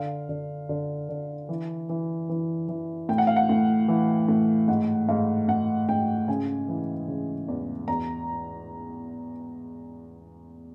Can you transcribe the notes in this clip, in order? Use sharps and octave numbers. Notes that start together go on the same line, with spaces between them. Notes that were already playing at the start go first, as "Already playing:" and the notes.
Already playing: D3 F5
D3
D3
D3
E3
E3
E3
E3
A2 G5
F#5
F5
F#5
A2
E3
A2
G#2 F#5
G#2 F5
G#2 F#5
G#2 G5
C#3 G#5
E3
C#3
E2
E2 A#5